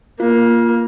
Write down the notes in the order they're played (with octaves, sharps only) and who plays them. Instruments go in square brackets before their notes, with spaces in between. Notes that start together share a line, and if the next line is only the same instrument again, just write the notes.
[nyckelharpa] A#3 [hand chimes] F4